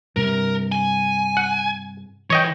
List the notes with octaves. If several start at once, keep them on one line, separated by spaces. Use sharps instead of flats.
G2 C3 A#4
G#5
F#5
E3 C#5 D#5 G5